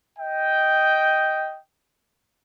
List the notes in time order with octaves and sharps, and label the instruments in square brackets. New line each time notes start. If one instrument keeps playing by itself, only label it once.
[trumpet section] D#5 G5